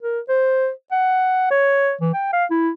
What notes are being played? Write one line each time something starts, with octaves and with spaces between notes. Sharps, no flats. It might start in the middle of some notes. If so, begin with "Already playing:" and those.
A#4
C5
F#5
C#5
E3
G5
F5
E4